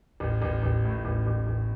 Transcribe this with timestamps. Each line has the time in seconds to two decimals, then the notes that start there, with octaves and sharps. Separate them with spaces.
0.20 A1
0.42 A1
0.62 A1
0.84 A2
1.05 A1
1.27 A1
1.47 A1